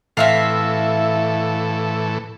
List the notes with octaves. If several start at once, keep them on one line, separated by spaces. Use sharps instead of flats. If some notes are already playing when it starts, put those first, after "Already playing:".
A2 E3 C4 A4 E5 F5